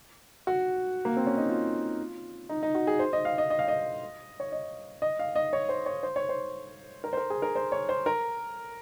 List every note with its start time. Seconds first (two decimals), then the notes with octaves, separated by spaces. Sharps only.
0.47 F#4
1.05 A#3
1.17 C4
1.27 C#4
1.37 D#4
1.49 F4
2.49 D#4
2.63 D#4
2.75 F#4
2.87 G#4
2.99 C5
3.13 D#5
3.25 F5
3.38 D#5
3.50 D#5
3.59 F5
3.68 D#5
4.40 C#5
4.52 D#5
5.02 D#5
5.19 F5
5.36 D#5
5.53 C#5
5.69 C5
5.86 C#5
6.03 C5
6.16 C#5
6.29 C5
7.04 A#4
7.13 C5
7.17 A#4
7.30 G#4
7.42 A#4
7.55 C5
7.72 C#5
7.89 C5
8.06 A#4